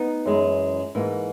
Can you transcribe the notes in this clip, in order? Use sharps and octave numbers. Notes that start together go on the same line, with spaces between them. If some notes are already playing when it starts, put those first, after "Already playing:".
Already playing: B3 D#4
F#2 E3 G#3
G#2 E3 A#3